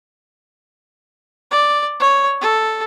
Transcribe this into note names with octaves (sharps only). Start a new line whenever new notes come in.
D5
C#5
A4